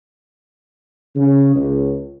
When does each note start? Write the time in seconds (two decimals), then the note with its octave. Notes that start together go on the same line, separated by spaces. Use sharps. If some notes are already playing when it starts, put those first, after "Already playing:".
1.16 C#3
1.56 C#2